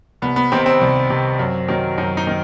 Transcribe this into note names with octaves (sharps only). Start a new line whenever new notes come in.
C2 B3
B3
C3 D#3 C4
C4
C2
C3 D#3
F#2
D#3 F#3
F#2 D#4
D#4
D#3